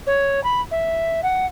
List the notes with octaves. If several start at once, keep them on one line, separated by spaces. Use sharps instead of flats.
C#5
B5
E5
F#5